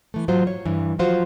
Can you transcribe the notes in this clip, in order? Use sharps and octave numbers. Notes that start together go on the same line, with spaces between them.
E3 A3
G#2 F#3 F4 C5
C#5
G2 E3
F3 F#3 F4 F#4 C5